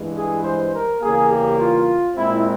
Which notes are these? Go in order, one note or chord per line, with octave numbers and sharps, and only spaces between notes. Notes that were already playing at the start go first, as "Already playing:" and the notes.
Already playing: G2 E3 G#3
G#4
C5
A#4
E2 C#3 G3 A#3 G#4
G4
F4
A#2 G#3 C4 E4